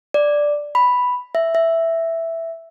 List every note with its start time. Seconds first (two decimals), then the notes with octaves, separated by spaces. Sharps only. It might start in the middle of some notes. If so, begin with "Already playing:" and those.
0.14 D5
0.75 B5
1.35 E5
1.55 E5